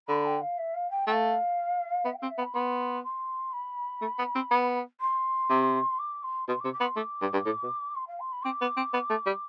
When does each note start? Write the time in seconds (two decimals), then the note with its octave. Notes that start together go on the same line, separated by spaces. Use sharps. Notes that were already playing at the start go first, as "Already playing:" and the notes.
0.08 D3 B5
0.25 G5
0.41 F5
0.58 E5
0.74 F5
0.90 G5
1.07 A3 G5
1.12 F5
2.05 B3 E5
2.14 G5
2.18 C4 F5
2.30 E5
2.38 B3
2.42 B5
2.54 B3 C6
3.04 C6
3.53 B5
4.02 A3
4.19 B3
4.35 C4
4.51 B3
5.01 C6
5.50 C3
5.99 D6
6.23 C6
6.48 B2 C6
6.60 D6
6.64 C3
6.73 D6
6.80 B3
6.84 C6
6.96 A3 D6
7.22 G2
7.33 G2
7.46 A2
7.63 B2
7.95 C6
8.08 F5
8.20 C6
8.32 B5
8.44 C4 D6
8.61 B3
8.77 C4
8.93 B3
9.10 A3
9.26 G3